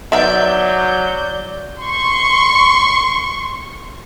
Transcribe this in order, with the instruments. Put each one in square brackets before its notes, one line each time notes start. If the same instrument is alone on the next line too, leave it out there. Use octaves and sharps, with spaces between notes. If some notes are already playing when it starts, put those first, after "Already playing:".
[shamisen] D#3 B3 D#4 [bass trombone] F#3 [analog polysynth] D5 G6 [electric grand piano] E5
[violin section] C6 C#6